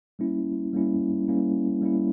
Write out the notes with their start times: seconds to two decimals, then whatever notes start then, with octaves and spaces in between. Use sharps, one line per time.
0.19 G3 A#3 C#4 E4
0.73 G3 A#3 C#4 E4
1.28 G3 A#3 C#4 E4
1.82 G3 A#3 C#4 E4